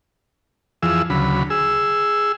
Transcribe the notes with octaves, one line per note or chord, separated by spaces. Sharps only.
F2 E3 F3 G#4 E6
D2 C#3 F#3 B5
G#4 E6